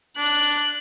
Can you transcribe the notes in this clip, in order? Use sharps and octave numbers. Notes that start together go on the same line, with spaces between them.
D4 F#6